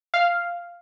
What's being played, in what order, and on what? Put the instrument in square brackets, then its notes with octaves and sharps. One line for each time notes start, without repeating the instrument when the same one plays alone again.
[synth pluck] F5